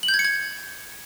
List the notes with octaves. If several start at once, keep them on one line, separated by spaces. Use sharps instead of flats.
F#7
G6
G#6
C#7
G#6